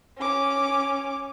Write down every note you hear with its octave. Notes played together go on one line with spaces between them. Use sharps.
C#4 D6